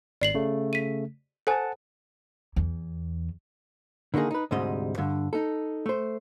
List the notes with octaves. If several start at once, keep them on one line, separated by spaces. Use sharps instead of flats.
G#1 D5 C7 F#7
C#3 A3
B6 D#7
A4 C5 F#5 G#5 A5
E2
D3 D#3 A#3 D#4 G#4
D#4 B4
D2 G#2 C3 G3 G#3 D#5
G2 D3
D#4 A4
A3 C5